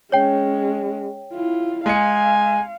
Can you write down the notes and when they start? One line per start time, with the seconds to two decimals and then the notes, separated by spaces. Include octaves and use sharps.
0.12 G#3 C#4 C#5 G5
1.34 E4 F4
1.86 G#3 F5 G#5 C#7